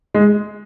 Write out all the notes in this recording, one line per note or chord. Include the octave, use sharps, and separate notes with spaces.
G#3